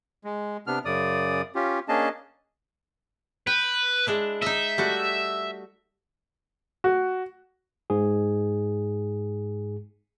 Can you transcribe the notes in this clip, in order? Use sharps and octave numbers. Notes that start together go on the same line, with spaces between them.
G#3
C3 B3 D4 F6
F#2 C#3 D5 D#6
C#4 F4 G4
A#3 C#4 D4 G#4 D#5 A5
B4 G5
G#3 D4 E4
D#4 D#5 E5
G3 A3 F#4
F#4
G#2 G#4